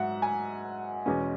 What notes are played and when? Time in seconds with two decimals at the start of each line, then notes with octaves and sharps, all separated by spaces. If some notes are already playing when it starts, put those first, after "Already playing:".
Already playing: G#2 F#3 E5 F#5
0.22 G#5
1.06 E2 B2 G#3 C#4